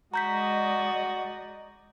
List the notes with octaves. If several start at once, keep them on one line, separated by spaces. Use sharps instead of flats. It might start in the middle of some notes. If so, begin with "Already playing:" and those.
G#3 F#4 D5 D#5 A#5 G6 B6